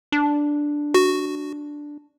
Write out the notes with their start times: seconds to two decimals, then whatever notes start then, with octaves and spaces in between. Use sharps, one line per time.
0.12 D4
0.94 F#4